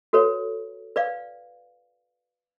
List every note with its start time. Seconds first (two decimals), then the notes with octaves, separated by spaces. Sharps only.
0.13 F#4 A4 B4 C#5
0.96 B4 D5 F5